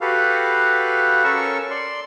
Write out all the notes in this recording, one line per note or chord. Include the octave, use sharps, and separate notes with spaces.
F#4 G4 A4 B4 F5
C#4 A4 A#4 C#6 E6
D5 C6